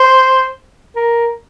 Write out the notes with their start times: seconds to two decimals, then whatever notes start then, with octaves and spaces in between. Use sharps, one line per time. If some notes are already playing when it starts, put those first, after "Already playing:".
Already playing: C5
0.96 A#4